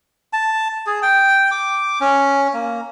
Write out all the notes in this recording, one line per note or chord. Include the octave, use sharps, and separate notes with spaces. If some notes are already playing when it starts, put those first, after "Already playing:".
A5
G#4
G5
D6
C#4
A#3